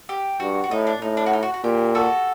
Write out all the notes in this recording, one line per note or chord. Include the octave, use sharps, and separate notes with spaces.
G4
G2 F#4
F#4
A2 D#4
D4
A2 D#4
D4
F#4
D#4
F#4
F#4
A#2 G4
F#4 A4